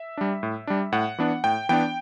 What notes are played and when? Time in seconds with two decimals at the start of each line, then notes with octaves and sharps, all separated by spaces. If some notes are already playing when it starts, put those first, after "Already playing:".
Already playing: E5
0.17 G3 D4
0.43 A2
0.67 G3 D4
0.92 A2 F#5
1.18 E3 B3 D4
1.44 A2 G5
1.69 E3 B3 D4 G5